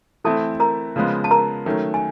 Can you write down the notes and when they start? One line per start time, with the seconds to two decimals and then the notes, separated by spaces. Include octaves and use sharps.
0.24 E3 A3 C4 E4 A4 A5
0.60 A#4 A#5
0.96 C#3 F3 G#3 B3
1.24 A5
1.31 A#4 A#5
1.66 D#3 F#3 A3 C#4
1.94 G#5